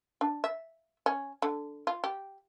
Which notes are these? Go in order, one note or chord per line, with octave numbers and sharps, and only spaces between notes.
D4
E5
C#4
D3
F4
G4